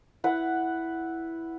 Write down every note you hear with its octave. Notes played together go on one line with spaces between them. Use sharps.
E4 B4 F#5